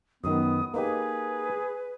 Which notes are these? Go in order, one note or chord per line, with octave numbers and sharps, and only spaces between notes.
F#2 D#3 B3 D#6
A#3 D#4 G4 G#4 B4